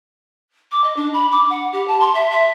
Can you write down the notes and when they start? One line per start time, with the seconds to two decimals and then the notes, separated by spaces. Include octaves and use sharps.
0.72 D6
0.84 D#5
0.96 D4
1.13 B5
1.32 D6
1.50 F#5
1.73 G4
1.88 A5
2.01 C6
2.15 E5
2.31 E5